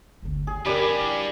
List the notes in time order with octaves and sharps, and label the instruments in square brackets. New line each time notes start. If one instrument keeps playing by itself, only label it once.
[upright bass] G1 D2
[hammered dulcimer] G#4
[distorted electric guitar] G2 [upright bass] C#4 [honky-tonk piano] G4 A#4 [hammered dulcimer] D5 B5
[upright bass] E4